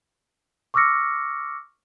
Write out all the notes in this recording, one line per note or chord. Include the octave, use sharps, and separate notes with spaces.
C#6 D6 E6 F6 A#6 C#7